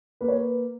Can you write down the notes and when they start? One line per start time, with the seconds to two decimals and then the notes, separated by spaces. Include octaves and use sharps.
0.21 A#3 B4
0.28 C#5
0.35 B4